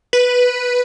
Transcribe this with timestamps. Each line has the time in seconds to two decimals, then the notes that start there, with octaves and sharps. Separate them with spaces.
0.13 B4